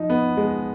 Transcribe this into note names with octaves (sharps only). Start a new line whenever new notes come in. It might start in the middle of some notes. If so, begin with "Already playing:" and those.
Already playing: F3 D#4
B3
G#3